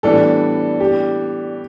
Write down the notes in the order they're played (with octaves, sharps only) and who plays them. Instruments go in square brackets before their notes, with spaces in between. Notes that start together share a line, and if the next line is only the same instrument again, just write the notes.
[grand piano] A2 E3 G3 B3 D4 [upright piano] A4
[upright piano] G4